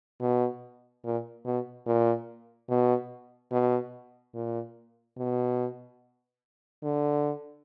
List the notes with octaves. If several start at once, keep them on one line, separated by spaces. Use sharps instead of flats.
B2
A#2
B2
A#2
B2
B2
A#2
B2
D3